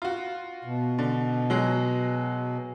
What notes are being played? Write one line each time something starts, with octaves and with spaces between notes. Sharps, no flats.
F4 F#4
B2
D3
F#3 G#3